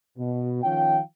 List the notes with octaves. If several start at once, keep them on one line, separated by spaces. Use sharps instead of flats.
B2
D#3 F3 C#4 F4 F5 G5